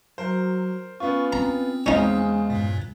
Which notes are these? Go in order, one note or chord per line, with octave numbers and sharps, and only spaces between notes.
F#3 A#4 C5
B3 C#4 F4 C#6
C4 A#5
E2 C#3 G#3 C#4 D#4 C5
G2 A#2